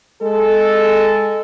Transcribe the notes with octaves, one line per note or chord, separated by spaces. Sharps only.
G#3 A4